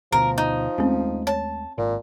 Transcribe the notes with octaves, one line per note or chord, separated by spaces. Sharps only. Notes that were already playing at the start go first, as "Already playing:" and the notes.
D2 B2 F3 A#4
D#4
D#2 G#3 A3 C4 C#4
C#5 A5
G#1 A#2